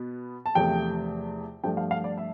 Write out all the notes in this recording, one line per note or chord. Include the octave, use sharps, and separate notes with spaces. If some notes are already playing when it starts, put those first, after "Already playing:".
Already playing: B2 B3
A5
E2 C3 F3 A3 G5
G2 F3 A3 G5
F5
F5
D5
E5